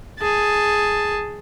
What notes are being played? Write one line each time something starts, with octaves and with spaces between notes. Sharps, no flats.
G#4 A5